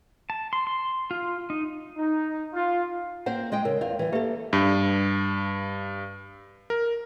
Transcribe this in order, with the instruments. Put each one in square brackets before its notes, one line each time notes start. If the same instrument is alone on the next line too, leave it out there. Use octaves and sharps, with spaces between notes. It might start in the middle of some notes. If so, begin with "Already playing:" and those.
[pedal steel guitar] A5
C6
C6
F4
D#4
[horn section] D#4
F4
[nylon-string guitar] A#3 C4 C5 [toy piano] F#5
[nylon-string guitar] G#3 D#5 G5
[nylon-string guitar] C#3 [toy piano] A#4
[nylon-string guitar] E2 F5 [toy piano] D5
[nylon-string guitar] E3 G3
[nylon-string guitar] A#3 A4 [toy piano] G4 B4 E5
[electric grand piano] G2
A#4